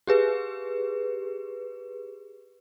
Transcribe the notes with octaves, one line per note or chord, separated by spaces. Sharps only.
G4 G#4 B4